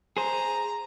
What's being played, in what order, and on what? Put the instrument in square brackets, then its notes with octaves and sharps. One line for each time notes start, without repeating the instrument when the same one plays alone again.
[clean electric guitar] G#4 C5 [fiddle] A#5